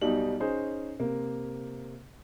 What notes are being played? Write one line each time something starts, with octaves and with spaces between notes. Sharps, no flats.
B1 B2 G3 D#4 F#7
C#4 D#4 G#4 C5
C3 A#3